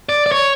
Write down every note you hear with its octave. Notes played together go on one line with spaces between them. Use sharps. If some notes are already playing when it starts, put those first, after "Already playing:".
D5
D5
C#5